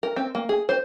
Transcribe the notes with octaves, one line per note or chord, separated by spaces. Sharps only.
A#4
C4
A#3
G#4
C5